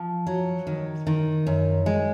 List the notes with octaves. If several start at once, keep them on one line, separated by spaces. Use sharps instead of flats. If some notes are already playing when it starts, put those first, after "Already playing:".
Already playing: F3
F#3
D#3
D#3
F#2
G#3